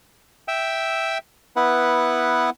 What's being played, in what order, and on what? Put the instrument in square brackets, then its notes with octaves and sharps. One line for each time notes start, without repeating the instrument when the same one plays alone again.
[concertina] E5 G5 E6
B3 E4 B4 F#5